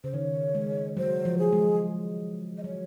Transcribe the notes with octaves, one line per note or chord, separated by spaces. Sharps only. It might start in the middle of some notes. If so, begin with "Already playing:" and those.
C#3 C5
D#3 C#5
G#3
F#3 C5
F3
G#4
G#3
D#5
F#3 C#5